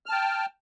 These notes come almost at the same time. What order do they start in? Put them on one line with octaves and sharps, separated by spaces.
F6 A5 G5